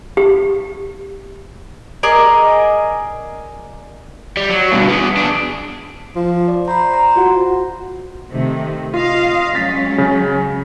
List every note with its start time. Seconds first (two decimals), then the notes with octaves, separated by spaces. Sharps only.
0.17 G4
2.03 G#4 A#4 D5 D#5
4.37 G3
4.50 F#3
4.72 G2 B2
4.88 B3 G#4
5.17 D4 G#4
6.16 F3
6.48 D5
6.68 C5 A#5 B5
6.94 A#5
7.16 F4 F#4 F#5
8.31 C3 D#3 A3
8.94 F4 D#5 F5
9.55 F#3 G#3 C#4 A6 B6
9.98 C#3